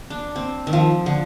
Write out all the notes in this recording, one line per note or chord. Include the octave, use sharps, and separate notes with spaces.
D4
C4
D#3
F3
D3